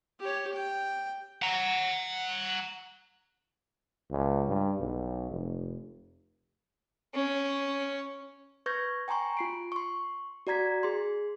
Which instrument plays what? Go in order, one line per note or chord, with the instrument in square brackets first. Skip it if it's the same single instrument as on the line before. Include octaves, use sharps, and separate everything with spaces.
[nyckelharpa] G4 C#5
G5
[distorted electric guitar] F#5 A#5
[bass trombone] C#2
G2
B1
F1
[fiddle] C#4
[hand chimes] B4 C#6 G6 G#6 A#6
G5 G#5 A#5 C6 C#6
F4 C7 D7
C6 C#6
F#4 D5 A#5 G#6 B6
G#4 C6